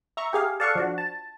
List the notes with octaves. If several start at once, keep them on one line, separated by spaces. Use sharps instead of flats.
E5 A#5 C#6
G4 G#4 F5
A4 D5 F5 F#5 A5 C#6
F3 D4 F#4
A5